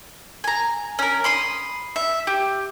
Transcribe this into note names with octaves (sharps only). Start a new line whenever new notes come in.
G#5 A#5
C#4 A#4
B5 C6 D#6
E5
G4